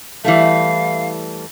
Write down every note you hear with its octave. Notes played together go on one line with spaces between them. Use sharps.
E3 G3 A3 F5